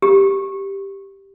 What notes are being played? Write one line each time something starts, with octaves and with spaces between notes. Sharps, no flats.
G4